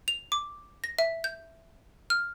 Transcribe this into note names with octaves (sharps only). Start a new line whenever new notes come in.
F7
D6
A#6
E5
G6
F6